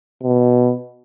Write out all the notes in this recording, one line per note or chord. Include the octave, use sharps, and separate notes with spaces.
B2